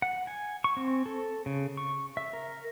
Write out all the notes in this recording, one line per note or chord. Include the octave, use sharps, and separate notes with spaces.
F#5
G#5
C#6
C4
A4
C#3
C#6
E5
A#4